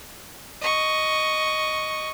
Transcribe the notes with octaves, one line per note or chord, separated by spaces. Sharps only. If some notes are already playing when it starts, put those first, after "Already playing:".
D#5 C#6